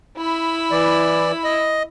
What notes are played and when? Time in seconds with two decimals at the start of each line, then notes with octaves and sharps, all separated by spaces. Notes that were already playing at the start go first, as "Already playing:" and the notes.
0.18 E4 B5
0.71 E3 D5
1.44 D#5